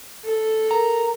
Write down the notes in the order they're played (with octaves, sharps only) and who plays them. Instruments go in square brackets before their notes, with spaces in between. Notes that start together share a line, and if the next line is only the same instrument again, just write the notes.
[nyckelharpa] A4
[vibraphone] A#4 [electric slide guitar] A#5